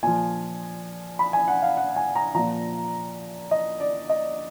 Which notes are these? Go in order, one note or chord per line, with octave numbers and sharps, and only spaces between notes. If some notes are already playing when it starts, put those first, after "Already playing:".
A#2 F3 G#5
B5
G#5
F#5
F5
F#5
G#5
A#5
A#2 F3 A#5
D#5
D5
D#5